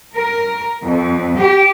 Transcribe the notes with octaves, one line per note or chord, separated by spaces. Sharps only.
A#4
F2
G4